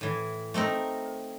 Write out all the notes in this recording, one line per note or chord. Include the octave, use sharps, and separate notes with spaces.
A2 E3
A3 C4 D#4 A#4